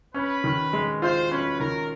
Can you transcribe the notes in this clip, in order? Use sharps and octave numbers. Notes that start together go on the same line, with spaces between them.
C#4 B4
D#3
G#3
F4 C5
C#4 B4
D#3 A#4